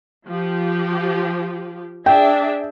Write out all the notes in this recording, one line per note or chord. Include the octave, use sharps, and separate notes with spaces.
F3 G4
D4 G#4 E5 G5